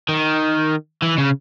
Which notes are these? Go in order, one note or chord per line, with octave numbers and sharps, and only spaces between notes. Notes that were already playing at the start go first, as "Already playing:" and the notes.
D#3
E3
C#3